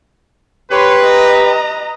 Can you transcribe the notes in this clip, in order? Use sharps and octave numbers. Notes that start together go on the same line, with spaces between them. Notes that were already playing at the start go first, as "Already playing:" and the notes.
G4 B4 C#5 C6
D#5 A#5